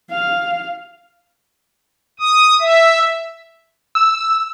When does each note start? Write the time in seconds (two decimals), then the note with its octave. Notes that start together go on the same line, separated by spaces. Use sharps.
0.11 F5
2.19 D#6
2.60 E5
3.95 E6